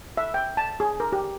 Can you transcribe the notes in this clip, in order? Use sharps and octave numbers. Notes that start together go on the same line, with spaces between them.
E5
G5
A5
G#4
A#4
G4